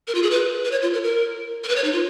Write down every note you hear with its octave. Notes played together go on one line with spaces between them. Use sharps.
A#4
F4
G#4
B4
B4
C#5
F4
A#4
A#4
A#4
B4
C#5
D#4
F4